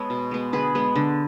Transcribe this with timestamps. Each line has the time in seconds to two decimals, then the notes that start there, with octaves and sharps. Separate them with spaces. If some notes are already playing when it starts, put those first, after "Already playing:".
Already playing: G#3 B3 A4 C#5
0.10 B2
0.31 G#3 B3
0.53 D3 G#4 B4
0.75 G#3 B3
0.96 D3